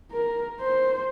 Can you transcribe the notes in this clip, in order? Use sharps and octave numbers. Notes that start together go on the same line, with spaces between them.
A#4
C5